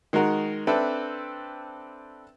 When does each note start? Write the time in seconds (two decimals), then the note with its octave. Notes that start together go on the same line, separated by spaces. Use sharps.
0.13 D#3 G#3 F#4 A#4 F#5
0.67 C4 D4 A4 B4 E5